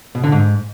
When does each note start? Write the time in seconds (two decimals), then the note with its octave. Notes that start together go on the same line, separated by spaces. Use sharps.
0.15 B2
0.24 D3
0.32 G#2